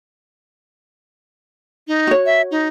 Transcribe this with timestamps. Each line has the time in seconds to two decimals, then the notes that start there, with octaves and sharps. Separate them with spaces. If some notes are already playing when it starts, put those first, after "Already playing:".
1.88 D#4
2.07 F#4 C#5
2.26 E5
2.51 D#4